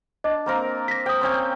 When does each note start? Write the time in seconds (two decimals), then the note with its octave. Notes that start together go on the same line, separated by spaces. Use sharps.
0.24 D4 D#5
0.46 A#3 C4 A#4
0.88 A#6 B6
1.06 C5 G5 D#6
1.21 C4 C#4 G5